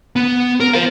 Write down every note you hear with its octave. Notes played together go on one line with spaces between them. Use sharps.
B3
A#4
C5 F5